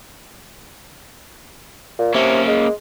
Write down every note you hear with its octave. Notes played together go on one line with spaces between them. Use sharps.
A#2
C3 A#3 C#4
G#3